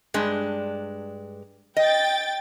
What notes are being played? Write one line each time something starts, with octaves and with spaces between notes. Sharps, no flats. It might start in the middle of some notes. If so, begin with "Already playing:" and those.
G2 G#3 D4
D#5 G5 A6